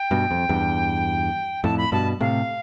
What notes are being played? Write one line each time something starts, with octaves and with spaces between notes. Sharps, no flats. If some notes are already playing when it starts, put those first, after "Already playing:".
Already playing: G5
G2 B2
F2
E2 G2
F2 A2 A5
B5
G2 B2 A5
A2 C3 F5